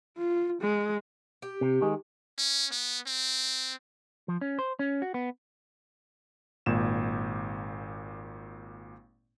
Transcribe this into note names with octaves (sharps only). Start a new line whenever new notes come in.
F4
G#3
G4
C3
D#3 G#3
C#4
B3
C4
F3
C#4
C5
C#4
F#4
B3
G#1 A#2 E7